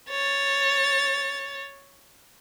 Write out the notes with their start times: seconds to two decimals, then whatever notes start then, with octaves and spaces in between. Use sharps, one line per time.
0.10 C#5 A6